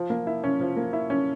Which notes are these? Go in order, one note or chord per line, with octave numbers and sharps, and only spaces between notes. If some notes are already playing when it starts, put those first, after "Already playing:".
Already playing: F3
A#3
E4
C#4
F3
A#3
E4
C#4